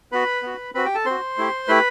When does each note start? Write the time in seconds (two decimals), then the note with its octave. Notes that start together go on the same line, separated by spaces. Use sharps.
0.12 B3 F#4 B4 B5
0.43 B3 F#4
0.74 C4 F#4 B4 B5
0.85 G4 G5
0.95 A4 A5
1.06 C4 F#4 C5 C6
1.38 A3 E4 G4
1.68 A3 E4 G4 B4 B5